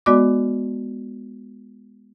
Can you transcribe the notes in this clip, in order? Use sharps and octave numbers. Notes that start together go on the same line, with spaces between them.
G#3 B3 F#4 D5 D#5 D6